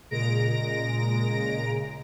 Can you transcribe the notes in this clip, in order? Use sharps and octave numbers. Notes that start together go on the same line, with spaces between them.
A#2 C#3 G#3 A#5 A#6 D7